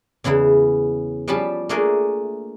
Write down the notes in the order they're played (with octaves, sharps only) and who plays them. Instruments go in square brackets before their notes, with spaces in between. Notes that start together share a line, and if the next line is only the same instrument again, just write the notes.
[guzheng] E2 C#3 B3 E4
F3 G3 C#4 F5 A5 B5
A3 A#3 D4 G#4 A#4 E5